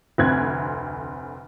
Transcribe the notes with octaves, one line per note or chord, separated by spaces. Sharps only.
F1 D2 C4 F#6 G#6